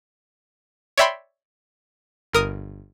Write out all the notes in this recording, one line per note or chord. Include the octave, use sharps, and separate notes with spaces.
C#5 D5 E5 G5 B5 C6
G1 A#4 D#6